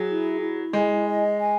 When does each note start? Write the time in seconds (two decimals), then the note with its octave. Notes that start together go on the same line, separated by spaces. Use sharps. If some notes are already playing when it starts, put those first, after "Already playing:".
Already playing: F#3 G#4
0.09 E4
0.42 E4
0.73 G#3 G#5
1.07 D#5
1.39 G#5